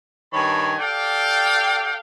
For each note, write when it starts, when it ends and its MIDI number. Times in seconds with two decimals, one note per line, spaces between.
0.33 0.75 43
0.33 0.75 51
0.33 0.75 73
0.33 0.75 80
0.33 0.75 81
0.33 0.75 83
0.79 1.97 67
0.79 1.97 69
0.79 1.97 74
0.79 1.97 77
0.79 1.97 79